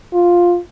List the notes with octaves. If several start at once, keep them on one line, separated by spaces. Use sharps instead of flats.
F4